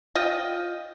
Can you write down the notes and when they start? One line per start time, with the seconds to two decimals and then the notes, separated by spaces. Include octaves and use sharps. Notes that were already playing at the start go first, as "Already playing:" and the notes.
0.15 F4 D#5 G5